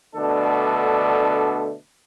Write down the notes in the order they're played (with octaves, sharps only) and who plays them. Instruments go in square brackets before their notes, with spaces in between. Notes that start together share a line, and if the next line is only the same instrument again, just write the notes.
[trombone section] B2 D3 A3 D4 A4